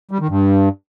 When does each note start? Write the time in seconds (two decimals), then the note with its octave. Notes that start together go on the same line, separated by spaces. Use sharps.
0.11 G3
0.20 D#3
0.29 G2